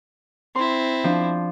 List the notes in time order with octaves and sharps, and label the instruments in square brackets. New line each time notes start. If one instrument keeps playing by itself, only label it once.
[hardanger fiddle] C4 E4 [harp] C6
[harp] F3 D4